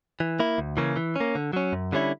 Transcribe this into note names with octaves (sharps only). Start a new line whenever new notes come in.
E3
A#3 E4
D2
C#3 E3 A#3 C#4
E3
A#3 C#4
D3
F#3 C#4
F#2
D3 G3 C#4 E4